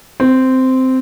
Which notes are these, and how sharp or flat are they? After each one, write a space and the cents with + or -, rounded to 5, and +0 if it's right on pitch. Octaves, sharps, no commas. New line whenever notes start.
C4 -10